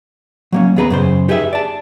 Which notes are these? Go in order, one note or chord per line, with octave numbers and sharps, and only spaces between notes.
F#3 A#3 C#4
D#2 B3 G#4 B4 A#5 B5
F#2 C#3 C5
D#4 G4 G#4 B4 C5 E5
D5 A5